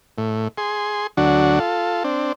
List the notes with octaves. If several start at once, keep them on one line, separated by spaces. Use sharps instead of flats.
A2
G#4 C6
D2 F#3 D4 F#4
F4 A4
C4 D4